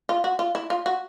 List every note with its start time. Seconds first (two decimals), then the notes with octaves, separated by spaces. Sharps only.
0.09 F4
0.24 F#4
0.39 F4
0.55 E4
0.70 F4
0.86 F#4